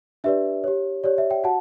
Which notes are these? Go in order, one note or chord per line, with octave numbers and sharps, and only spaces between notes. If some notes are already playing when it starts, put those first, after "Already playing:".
D4 G4 B4 D5 E5
G4 C#5
G4 C#5 D5
E5
E5 G5
F#4 F#5 A5